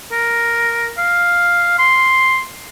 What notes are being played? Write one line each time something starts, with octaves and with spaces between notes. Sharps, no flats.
A#4
F5
C6